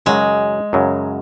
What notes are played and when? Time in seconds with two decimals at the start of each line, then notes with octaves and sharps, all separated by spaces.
0.06 F#2 C#3 F#3 G#3
0.73 F#2 C#3 F#3